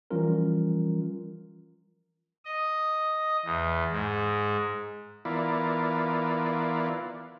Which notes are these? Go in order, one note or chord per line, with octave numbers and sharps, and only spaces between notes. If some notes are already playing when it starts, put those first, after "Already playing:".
E3 F3 G3 C#4 F4 A#4
D#5
E2
G#2
E3 B3 E4 F4 A#4 D5